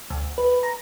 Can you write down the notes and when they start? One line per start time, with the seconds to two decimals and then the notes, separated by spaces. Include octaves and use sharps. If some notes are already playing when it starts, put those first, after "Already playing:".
0.10 D2
0.38 B4
0.63 A#5